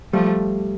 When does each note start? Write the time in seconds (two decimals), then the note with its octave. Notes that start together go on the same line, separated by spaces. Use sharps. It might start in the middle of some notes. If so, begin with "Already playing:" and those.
0.13 F3 G3 A3